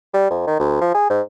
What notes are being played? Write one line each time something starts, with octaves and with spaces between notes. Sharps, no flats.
G3
F2
D#3
D2
F3
G#4
G#2